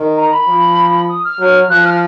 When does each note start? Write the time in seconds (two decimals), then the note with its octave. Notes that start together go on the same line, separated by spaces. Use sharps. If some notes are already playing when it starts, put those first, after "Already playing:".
Already playing: D#3
0.17 A#5
0.33 B5
0.48 F3
1.09 D#6
1.24 F6
1.39 F#3
1.69 F3 F#6
1.85 F6